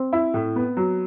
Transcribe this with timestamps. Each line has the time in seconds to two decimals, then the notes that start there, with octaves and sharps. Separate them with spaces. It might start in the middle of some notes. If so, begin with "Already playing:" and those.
Already playing: C4
0.13 E4
0.34 A2
0.56 B3
0.77 F#3